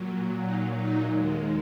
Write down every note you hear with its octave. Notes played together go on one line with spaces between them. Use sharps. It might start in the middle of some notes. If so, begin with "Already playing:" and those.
Already playing: A#2 F#3
D#4
D#4
D#2 D#3 G#3